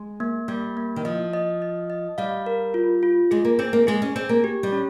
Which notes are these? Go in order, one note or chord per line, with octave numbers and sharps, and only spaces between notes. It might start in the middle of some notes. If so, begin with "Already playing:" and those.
Already playing: G#3
A#3
G3 A#3
A#3
D#3
F3 D#5
D#5
D#5
D#5
G3 F5
A#4
F4
F4
G#3 G#4
A#3
C4 G#4
A#3
G#3 G#4
C#4
C4 G#4
A#3
G4
G3
C#4